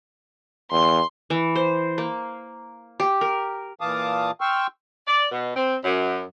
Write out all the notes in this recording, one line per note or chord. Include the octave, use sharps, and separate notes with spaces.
E2 C6
E3
C5
A#3
G4
A#4
A#2 E3 F5 A5 D6 D#6
G5 C6 C#6 E6 F6
D5
B2
C4
F#2